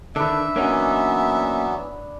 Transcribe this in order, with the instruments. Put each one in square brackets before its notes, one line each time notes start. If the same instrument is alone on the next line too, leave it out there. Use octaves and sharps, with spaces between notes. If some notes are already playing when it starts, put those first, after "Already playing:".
[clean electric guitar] D3 D#3 [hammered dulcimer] D4 B4 [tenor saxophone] E5
[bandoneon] E3 F#3 B3 [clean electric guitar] A#3 C#4 D#4